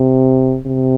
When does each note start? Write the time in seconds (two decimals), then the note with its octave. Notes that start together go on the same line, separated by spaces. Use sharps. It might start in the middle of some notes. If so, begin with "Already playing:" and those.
Already playing: C3
0.66 C3